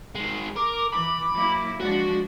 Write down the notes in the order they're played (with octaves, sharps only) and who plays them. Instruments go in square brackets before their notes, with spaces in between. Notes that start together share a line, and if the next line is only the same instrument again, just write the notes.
[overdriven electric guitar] D#3 G#3
[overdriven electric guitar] A#4 [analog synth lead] D6
[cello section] E3 [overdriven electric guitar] B5
[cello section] F#3 A#3 E4
[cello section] F3 G#3 D4 [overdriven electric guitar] F#4